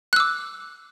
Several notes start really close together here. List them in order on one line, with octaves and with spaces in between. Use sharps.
F#6 E6 D6